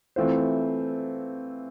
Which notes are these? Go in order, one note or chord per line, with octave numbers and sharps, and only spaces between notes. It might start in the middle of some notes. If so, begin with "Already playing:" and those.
E3 A3 C4 F4 C5